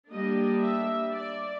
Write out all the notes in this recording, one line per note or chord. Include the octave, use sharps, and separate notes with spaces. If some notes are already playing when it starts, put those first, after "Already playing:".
G3 A#3 D4 D#5
E5
D5